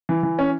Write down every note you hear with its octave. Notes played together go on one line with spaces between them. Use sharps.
E3
E3
C#4